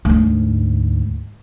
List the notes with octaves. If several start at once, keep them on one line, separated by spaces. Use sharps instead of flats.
D2 G#2